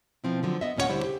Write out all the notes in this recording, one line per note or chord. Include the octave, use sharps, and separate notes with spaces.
B2 F3 C4 E4
D3 F3 F#3
B3 D#5 E5
D#2 A#2 C#4 D4 C#5 F#5
D2 D3 G3 E4 C5
C#3 G4